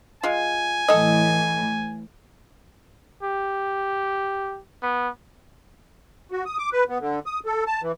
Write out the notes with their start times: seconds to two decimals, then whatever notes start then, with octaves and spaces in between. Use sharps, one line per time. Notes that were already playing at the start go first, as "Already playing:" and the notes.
0.23 G#3 F4 G#5
0.88 A2 E3 A4 D#5
3.23 G4
4.82 B3
6.31 F#4
6.46 D#6
6.58 D6
6.72 B4
6.89 B3
7.01 D3
7.26 D#6
7.45 A4
7.67 A5
7.82 E3